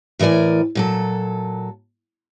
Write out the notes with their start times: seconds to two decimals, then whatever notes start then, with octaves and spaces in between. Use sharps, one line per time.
0.19 A2 E3 A#4 D5 G#5
0.75 A#2 F#3 A4